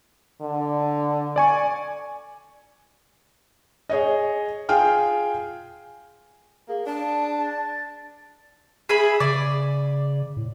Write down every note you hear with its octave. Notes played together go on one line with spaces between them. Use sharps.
D3
D5 G#5 C#6
G#4 C#5 D#5
F4 G#4 G5 G#5 F6
A#3 G#4
D4 A5
A6
G#4 E5 B5
C#3 D5
A2